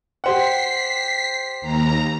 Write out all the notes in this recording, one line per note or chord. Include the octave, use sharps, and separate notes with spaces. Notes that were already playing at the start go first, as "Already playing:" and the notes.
G4 C5 F#5 B6 C7
D#2 A#5